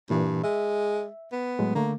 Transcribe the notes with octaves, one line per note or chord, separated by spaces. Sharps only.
G2 A#2 E3
G#3 E5
B3
A2 F#3 G#3
D3 A3 A#3